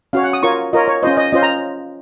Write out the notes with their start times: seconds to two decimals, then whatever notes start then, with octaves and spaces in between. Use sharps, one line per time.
0.13 C#4 F#4 C#5 F5
0.23 F#5
0.33 D#6
0.43 F4 A#4 C#5 C#6
0.73 F4 A#4 C#5 D#5
0.88 C#5
1.03 C#4 F4 C5 D#5
1.17 D#5
1.32 C#4 F4 C5 D#5
1.43 A#5